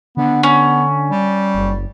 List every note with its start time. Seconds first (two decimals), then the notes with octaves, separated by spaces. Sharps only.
0.17 D3 B3
0.43 B3 C#4
1.11 G3
1.55 F#1